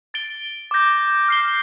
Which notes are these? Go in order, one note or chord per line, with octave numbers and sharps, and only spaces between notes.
A6 D7 G7
D6 G6 A#6
F6 C7 G7